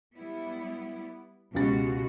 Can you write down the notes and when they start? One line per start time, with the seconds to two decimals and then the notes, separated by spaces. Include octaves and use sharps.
0.16 G3 B3 E4
1.55 C#2 B2 G#3 F#4 G4 A6